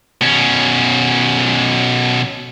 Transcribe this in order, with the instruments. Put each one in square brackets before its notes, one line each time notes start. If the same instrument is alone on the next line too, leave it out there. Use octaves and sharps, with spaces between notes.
[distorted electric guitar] B2 C#4